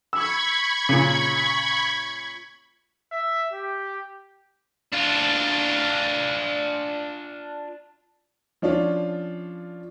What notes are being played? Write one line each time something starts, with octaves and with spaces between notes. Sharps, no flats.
B5 C#6 E6 G#6
A#2 C#3
E5
G4
D4 F4
F3 C#4 D4 F4